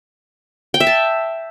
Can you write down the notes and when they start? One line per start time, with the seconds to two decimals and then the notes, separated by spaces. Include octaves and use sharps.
0.74 G5
0.80 E5
0.87 A5